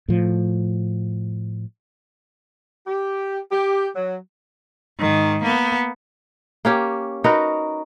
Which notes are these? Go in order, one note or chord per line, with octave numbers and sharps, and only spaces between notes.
A2 F3
G4
G4
F#3
G#2 D#3
A#3 B3
A#3 C#4 G4
D#4 F#4 A#4 B4